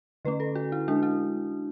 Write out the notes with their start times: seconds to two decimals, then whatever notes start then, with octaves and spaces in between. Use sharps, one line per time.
0.25 D3 A3 C#4 B4
0.40 A4
0.55 F#4
0.72 E4
0.88 G#3 D4 F#4
1.03 E4